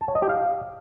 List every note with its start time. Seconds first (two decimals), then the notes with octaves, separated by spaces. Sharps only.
0.01 A5
0.08 C#5
0.15 D#5
0.22 G4
0.29 F5